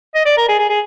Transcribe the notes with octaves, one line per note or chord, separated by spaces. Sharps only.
D#5
D5
A#4
G#4
G#4
G#4